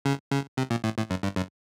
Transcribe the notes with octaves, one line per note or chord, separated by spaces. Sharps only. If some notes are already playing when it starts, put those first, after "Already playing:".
C#3
C#3
C3
A#2
A2
A2
F#2
G2
F#2